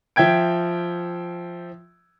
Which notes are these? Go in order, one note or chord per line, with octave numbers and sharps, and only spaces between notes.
F3 E5 G5 G#6 D7